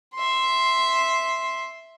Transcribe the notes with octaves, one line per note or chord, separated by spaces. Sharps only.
E5 C6